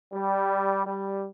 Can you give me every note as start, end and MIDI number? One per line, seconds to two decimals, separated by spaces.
0.13 0.82 55
0.85 1.25 55